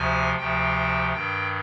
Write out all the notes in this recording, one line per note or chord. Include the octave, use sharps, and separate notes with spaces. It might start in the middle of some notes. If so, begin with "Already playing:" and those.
Already playing: D2 C3 F3 G#5
D2 C3 F3 G5
G2 D#3 G5